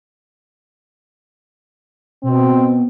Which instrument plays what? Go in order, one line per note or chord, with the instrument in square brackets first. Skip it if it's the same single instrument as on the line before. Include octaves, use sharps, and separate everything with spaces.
[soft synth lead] B2 [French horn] C4